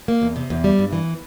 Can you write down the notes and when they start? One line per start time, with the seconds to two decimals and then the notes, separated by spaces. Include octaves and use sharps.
0.08 A#3
0.22 E2
0.36 C3
0.50 E2
0.64 G3
0.79 G2
0.93 E3